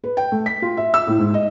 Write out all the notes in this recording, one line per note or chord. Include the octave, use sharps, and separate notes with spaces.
B4
G5
A3
B6
F4
E5
E6
A2
G#2
D#5